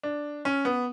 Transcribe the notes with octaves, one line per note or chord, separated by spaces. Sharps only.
D4
C#4
B3